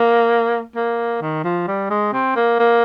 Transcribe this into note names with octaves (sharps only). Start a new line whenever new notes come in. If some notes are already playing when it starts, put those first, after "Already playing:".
Already playing: A#3
A#3
D#3
F3
G3
G#3
C4
A#3
A#3